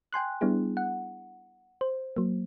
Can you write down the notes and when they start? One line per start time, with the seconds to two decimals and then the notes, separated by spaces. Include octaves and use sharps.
0.13 G5 G#5 C6 F#6
0.41 G3 B3 D4 E4 G#4
0.77 F#5
1.81 C5
2.17 F#3 A#3